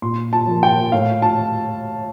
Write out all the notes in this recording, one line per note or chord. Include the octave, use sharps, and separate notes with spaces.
A#2 C6
A5
F3 A#3
G5
A2 F5
A5